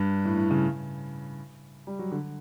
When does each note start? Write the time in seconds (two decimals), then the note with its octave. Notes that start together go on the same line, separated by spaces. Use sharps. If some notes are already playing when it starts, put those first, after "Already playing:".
Already playing: G2
0.25 A2
0.37 A2
0.51 C#3
1.87 G3
1.99 F#3
2.12 D3